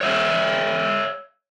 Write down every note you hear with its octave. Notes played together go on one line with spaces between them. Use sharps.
C#5 E5 F5